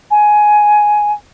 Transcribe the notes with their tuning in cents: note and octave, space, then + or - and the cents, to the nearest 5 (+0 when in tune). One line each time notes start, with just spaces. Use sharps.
G#5 +10